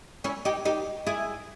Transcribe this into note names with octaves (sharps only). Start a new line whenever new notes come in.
C#4 E4
D#4 G4
D#4 G4
E4 G#4